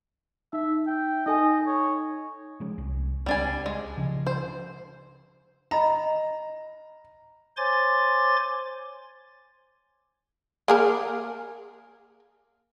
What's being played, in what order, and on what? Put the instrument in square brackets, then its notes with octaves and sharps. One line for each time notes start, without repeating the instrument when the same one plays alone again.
[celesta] D#4 [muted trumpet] E5
[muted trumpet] G5
[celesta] D#4 A4 G#5 [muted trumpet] D#5
[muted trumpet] C#5
[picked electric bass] F3 G#3 C#4
C2
[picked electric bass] C#2 C4 [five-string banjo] G3 D4 G#5
[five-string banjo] G#3
[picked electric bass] C#3 F3
[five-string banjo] C5
[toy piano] D#5 B5 [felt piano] A#5
[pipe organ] C5 C#5 G#5 C6 D6 A6
[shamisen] A#3 G#4 A#4